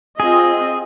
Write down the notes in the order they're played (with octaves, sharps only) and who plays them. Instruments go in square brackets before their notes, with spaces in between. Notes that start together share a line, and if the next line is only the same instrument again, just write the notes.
[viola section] C4 F4 D#5 [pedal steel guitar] G#4